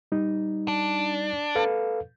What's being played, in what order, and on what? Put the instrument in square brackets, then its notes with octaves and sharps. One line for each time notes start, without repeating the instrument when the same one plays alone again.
[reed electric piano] G3 D#4
[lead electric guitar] D4
[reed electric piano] A4 B4 F5